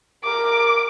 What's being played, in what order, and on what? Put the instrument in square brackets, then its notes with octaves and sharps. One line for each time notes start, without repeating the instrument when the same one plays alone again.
[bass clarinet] A#4 [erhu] D6